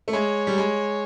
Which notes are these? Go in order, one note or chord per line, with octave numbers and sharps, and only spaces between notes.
A3
G#3 C#5
G3
G#3